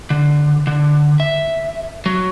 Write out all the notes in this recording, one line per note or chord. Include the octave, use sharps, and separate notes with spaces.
D3
D3
E5
F#3